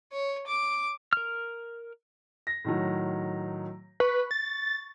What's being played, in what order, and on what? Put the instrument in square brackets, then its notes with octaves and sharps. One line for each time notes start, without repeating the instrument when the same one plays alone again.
[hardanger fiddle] C#5
D6
[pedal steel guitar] A#4 F6
[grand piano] A#6
A2 D#3 F#3
[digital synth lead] B4 [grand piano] C#6
[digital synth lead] A6